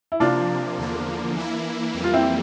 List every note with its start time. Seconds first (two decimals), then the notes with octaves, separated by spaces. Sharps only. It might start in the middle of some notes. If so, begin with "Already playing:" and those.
0.12 E4
0.20 C3 F3 A#3 D4 F4
0.78 E2 D3 F3 A#3
1.37 E3 A#3 E4
1.94 F2 E3 G3 A#3
2.04 F4
2.13 C4 E4